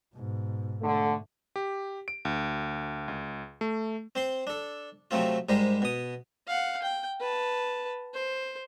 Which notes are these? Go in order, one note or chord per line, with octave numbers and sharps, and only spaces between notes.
G#2 B2
D3 A3
G4
D7
D2
C#2
A3
C4 C5 C6
D4 A4
C3 F3 F#3 A3 C4 F4
G#2 G3 G#3 A#4 C5
B2 D#6
F5 F#5
G5
B4 A5
C5